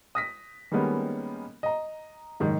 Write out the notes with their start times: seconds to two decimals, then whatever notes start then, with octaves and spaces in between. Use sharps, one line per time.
0.15 D#6 A#6 B6
0.72 D#3 G3 G#3 A#3 B3 C#4
1.63 D#5 A#5
2.40 F#1 G#2 D#3